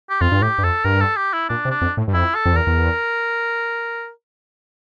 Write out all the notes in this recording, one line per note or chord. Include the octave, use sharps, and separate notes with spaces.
G4
F2 F4
G2
A2 G4
G2
F2 A4
G2 A#4
A4
G4
E4
A#2 D4
C3
D4
F2
A2
G2
F2 E4
A4
F2
E2
A#4
E2